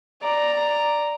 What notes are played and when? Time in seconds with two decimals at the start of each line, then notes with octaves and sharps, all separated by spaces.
0.23 D5 A#5